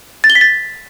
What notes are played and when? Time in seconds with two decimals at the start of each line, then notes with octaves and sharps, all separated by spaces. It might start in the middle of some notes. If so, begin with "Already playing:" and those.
0.24 A6
0.30 G7
0.35 B6
0.41 A6